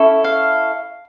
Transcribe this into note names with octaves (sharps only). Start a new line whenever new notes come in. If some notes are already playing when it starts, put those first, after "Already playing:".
Already playing: C#4 E4 A4
F5